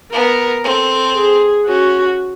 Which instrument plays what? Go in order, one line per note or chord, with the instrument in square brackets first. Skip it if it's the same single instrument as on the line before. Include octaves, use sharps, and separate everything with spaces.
[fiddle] B3 [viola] A#4
[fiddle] C4 [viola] A4
[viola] G#4
[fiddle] C#4 [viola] F#4